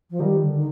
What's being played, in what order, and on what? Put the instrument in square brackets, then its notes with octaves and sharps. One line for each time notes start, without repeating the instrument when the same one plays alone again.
[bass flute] F3
[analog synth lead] D#3 [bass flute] G3
[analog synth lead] D3
[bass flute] D#3